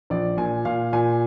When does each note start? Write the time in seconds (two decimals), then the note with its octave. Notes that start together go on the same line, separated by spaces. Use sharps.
0.10 A#1 D5
0.38 A#2 G#5
0.65 A#2 F5
0.93 A#2 G#5